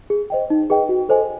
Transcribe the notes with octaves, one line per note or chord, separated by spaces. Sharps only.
G#4
C5 D#5 G5
D#4
G#4 B4 D#5 G5
F#4
A4 C5 D#5 G#5